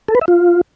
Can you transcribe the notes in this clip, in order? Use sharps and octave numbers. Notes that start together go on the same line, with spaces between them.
A4
B4
E5
F4